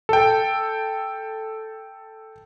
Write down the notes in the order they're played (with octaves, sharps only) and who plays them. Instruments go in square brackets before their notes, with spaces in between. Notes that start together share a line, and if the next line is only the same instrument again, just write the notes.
[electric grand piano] A4 G5